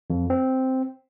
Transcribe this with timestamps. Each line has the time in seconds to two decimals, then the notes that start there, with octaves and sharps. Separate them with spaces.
0.10 F2
0.30 C4